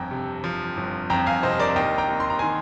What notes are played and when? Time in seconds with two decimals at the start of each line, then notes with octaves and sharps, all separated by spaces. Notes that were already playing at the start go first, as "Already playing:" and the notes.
Already playing: G1 F2 F3 G5 G#5 A#5
0.11 C3
0.44 F3
0.77 G1
1.10 F2 G5 A#5
1.26 F5 G#5
1.43 C3 C5 D#5
1.59 A#4 D5
1.76 D#2 D#5 G5
1.98 G5 A#5
2.09 D#2
2.20 C6
2.30 A#5
2.39 D#3 G#5 C6